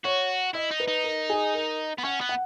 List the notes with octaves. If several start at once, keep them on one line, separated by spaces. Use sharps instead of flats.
F#4 C#5
E4 D#5
D#4
B4
D#4
A#4
G#4
A#4
B3
C#4 F#5
B3
F#5